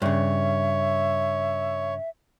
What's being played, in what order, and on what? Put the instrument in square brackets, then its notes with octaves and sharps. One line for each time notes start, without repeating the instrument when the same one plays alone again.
[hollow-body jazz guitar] G2 C#3 [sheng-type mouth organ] C#5 [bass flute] E5